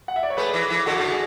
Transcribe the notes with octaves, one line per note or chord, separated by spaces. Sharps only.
F#5
E5
D5
C#5
A3 G#4 B4
E3
E3
D3 F#4 A4
C#3
D3
G#4